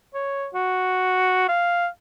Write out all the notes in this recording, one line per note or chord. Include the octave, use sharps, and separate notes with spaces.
C#5
F#4
F5